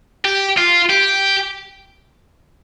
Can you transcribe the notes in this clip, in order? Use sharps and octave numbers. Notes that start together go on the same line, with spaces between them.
G4
F4
G4